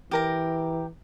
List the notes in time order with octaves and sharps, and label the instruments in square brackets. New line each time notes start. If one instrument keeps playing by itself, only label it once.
[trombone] E3 [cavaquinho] G4 A#4 A#5